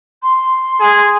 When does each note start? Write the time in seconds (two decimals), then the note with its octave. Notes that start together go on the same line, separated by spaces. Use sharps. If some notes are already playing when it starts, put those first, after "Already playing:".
0.22 C6
0.80 G#4